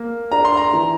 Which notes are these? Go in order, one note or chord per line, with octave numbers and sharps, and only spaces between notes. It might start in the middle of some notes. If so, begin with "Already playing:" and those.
Already playing: A#3
D4 A#5
C6
A#5
E3